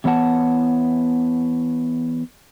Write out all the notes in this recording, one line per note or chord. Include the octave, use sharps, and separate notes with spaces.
E2 E3 B3 C#5 F#5 A5